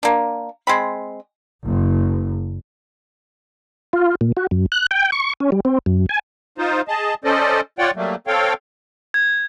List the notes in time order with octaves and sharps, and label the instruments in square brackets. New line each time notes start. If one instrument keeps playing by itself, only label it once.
[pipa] A#3 D4
G#3 C4 B5
[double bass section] F#1
[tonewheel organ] F4
A#2
F#4
F#2
F#6
G5
C#6
C#4
G3
C4
F#2
G#5
[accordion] D#4 F4 C5
G#4 D#5 A5
C#4 A4 C5 D5 D#5
F4 C#5 D5 F#5 G5
F#3 G3 A3 A#3
C4 A4 C#5 F5 G5
[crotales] G#6